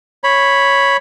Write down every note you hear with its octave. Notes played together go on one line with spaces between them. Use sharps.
C#5 B5